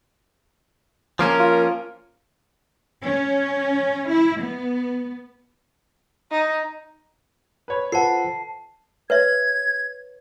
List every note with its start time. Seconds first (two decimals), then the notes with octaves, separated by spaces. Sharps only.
1.19 F3 A#3 C#4 A#4
1.40 F4
3.02 C#4
4.08 E4
4.40 B3
6.31 D#4
7.68 B4 C#5 B5
7.92 F4 A4 B4 C5 F#5 A5 B5 C7
9.10 B4 C#5 E5 G#6